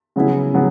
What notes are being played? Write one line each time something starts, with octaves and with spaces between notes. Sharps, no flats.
C#3 F#3 B3 E4
C#3 F#3 B3